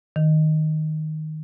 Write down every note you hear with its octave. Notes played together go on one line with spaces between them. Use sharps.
D#3